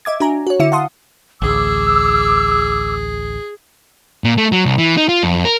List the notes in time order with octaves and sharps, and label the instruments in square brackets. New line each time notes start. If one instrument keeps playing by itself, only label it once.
[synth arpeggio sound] D#5 E5 D6 G#6
D4 F#4 G#5 A#5
F#4 C#5
D3 E4 E5 C#7
F5 F#5 A5 C6 D#6
[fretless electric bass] A1 D2 [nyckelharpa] G#4 [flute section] D6 E6
[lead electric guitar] A#2
A3
F#3
C2
E3
D#4
F4
F2
A#4